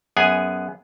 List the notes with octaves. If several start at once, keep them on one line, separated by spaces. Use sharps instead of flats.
F#2 B3 G#4 G#5